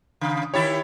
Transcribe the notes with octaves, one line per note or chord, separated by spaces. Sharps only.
C#3
D#3 E4 G4 C#5 B5 A6